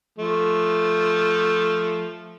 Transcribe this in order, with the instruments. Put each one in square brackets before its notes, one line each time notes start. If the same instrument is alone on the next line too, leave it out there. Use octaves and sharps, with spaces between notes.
[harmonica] F3 A3